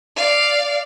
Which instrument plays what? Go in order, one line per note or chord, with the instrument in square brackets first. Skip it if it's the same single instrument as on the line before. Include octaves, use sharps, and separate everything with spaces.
[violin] D5 F5